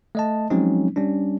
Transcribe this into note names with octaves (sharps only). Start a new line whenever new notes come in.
A3 D#5 A5
F3 F#3 G#3 C4 C#4 D#4
G3 C#4 D4